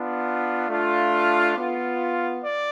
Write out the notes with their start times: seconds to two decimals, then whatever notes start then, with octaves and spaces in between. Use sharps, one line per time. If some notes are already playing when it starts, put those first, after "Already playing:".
Already playing: B3 D4 F4
0.68 A3 D4 F4
1.13 F5
1.56 B3 F4
2.42 D5